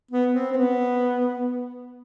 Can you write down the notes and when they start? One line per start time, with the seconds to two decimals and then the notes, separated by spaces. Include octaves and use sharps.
0.11 B3
0.33 C4
0.52 C4
0.57 B3